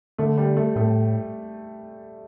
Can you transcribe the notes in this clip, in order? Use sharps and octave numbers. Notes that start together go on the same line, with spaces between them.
D3 A3
G3
A3
A2 A3